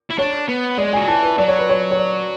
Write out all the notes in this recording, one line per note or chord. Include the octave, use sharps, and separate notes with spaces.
E4
D4 C#5
B3
G#3 D5
G#5
F#3
E3 A5
B4
F#3 D5
C#5
B4
C#5
C#5
D5